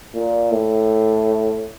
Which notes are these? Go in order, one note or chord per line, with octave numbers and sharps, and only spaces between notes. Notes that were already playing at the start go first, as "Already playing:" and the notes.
A#2
A2